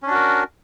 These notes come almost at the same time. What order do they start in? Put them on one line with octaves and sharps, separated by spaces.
C#4 D4 F#4 A#4